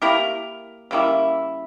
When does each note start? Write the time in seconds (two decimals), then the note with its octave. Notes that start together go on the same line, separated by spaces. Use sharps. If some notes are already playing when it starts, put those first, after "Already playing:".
0.02 A#3 E4 G4 A#4
0.91 C#3 G3 A#3 E4